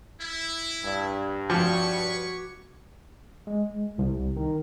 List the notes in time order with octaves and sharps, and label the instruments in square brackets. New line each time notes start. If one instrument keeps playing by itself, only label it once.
[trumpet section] E4
[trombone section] G2
[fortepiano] F3 [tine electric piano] F#4 D6 [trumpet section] B4 C#5 C#6
[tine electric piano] G#3
C2
D#3